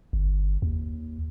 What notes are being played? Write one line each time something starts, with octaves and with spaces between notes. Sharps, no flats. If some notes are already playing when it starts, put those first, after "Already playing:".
G1
D#2